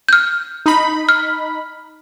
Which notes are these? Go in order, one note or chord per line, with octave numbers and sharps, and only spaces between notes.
F6 G6
D#4 B5
F6